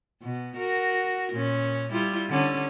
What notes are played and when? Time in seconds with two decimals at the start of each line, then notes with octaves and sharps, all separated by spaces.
0.21 B2
0.56 F#4 A#4
1.32 A#2 C#4
1.92 G3 E4 F4
2.29 D3 C#4